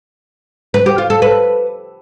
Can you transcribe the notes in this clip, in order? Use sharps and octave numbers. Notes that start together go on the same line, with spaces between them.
B4
G4
F4
A4
B4